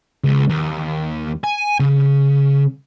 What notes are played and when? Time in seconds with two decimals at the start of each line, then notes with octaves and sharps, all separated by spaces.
0.24 C#2
0.49 D#2
1.44 G#5
1.80 C#3